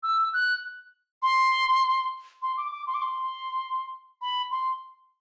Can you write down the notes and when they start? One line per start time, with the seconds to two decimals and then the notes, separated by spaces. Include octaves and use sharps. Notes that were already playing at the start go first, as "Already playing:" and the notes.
0.03 E6
0.33 F#6
1.22 C6
2.42 C6
2.57 D6
2.72 D6
2.87 C6
2.94 D6
3.02 C6
4.21 B5
4.51 C6